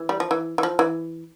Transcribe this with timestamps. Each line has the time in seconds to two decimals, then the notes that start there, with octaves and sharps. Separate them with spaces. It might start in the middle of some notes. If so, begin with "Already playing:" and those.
Already playing: E3
0.09 G3
0.20 F3
0.31 E3
0.58 E3
0.63 F3
0.79 E3